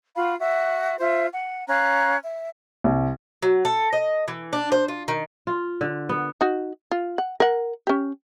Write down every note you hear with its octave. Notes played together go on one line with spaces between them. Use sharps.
F4 F#4 F5 B5
F#4 E5
F4 C5 E5
F#5
C#4 F5 A#5 F#6
E5
C2
F#3
A4
D#5
E3
D4
C5
F4
D#3
F4
D3
B3
D#4 F#4
F4
F#5
A#4 F#5
C#4 G4